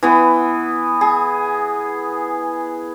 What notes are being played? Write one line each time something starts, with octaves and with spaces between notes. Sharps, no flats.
E3 B3
G#4